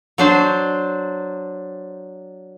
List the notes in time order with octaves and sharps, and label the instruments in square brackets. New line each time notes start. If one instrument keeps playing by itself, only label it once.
[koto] F#3 D4 C5